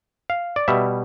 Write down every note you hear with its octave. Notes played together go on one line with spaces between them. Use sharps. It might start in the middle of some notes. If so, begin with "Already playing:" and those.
F5
D5
B2 G3 E5